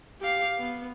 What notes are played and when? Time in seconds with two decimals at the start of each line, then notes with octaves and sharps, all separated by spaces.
0.21 G4 F5
0.58 B3